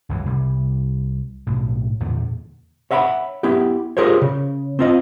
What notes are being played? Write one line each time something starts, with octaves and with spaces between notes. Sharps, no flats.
G1 C#2 E3
C2 G3
B1 A2
E2 A#2 D3 D#3
C#5 E5 F#5 A#5 B5
B3 E4 G4
F4 G4 G#4 A#4 C5 C#5
C#3
C4 F4 D#5